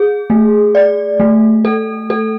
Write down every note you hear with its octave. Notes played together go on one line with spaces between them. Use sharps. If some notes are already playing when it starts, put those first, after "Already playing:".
Already playing: G#4
A3
D5
A3
A4
A4